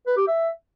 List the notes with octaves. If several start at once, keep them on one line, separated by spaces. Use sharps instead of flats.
B4
G4
E5